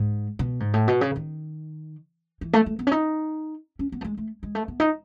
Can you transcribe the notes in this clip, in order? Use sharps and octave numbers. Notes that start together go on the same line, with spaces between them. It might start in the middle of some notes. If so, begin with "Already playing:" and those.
Already playing: G#2
B2
G#2
A2
B2
C#3
D#3
E3
A3
A3
B3
C#4
D#4
C#4
B3
A3
G#3
A3
G#3
A3
B3
D#4